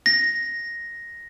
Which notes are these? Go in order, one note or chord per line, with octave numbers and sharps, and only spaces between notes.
A#6